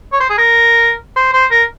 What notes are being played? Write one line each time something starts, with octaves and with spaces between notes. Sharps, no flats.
C#5
C5
G#4
A#4
C5
C5
A#4